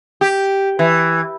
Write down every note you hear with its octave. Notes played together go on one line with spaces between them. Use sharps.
G4
E3